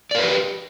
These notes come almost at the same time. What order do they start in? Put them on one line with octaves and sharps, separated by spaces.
D5 A#4 B4 G4